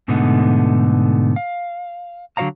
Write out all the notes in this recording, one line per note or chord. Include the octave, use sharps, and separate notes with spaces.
G#2 B2 D3 A3 B3 D#4
F5
D3 F#3 F#4 C#5 F5 A#5